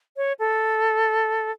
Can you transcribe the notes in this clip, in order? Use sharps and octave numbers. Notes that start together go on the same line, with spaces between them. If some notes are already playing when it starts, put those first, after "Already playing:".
C#5
A4